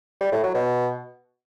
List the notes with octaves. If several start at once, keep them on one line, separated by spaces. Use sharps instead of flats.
G3
A2
F#3
B2